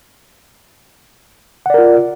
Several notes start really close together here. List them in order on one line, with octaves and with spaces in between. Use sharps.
F#5 D5 A#4 F4